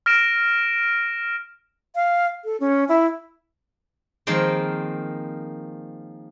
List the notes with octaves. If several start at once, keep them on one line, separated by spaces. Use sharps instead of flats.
F6 A#6 D7 E7
F5
A4
C#4
E4
D#3 F3 G#3 A#3 C4